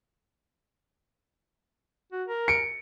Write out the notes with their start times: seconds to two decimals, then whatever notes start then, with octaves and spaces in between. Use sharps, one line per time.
2.12 F#4
2.28 A#4
2.48 C#7 D7